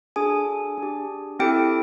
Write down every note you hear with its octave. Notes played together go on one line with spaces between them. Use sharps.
D4 F#4 G#4 A4 G#5
D4 G4
C4 E4 G4 A4 G5